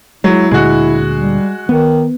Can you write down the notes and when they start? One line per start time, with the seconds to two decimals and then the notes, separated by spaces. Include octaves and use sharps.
0.24 F#3 G#3 E4
0.51 D2 A#2 D3 G#3 F#4
1.18 G3
1.69 D#3 B3